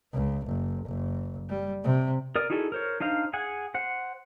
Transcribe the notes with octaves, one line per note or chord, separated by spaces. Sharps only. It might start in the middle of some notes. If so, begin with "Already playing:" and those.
C#2
F#1
F#1
G3
C3
A#4 D5 D#6
D#4 E4 F#4 G#4 A4
A#4 C5 C#5
D4 D#4 C5 F5
G#4 F#5 G#5
C5 F#5